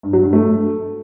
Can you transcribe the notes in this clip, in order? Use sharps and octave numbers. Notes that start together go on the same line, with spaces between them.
G2
F#3
G2
A3